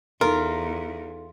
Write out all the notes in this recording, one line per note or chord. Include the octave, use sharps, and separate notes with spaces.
E2 D#4 F4 A4 A#4